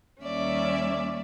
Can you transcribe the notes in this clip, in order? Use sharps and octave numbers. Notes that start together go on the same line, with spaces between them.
D#2 G3 C#4 D5 E5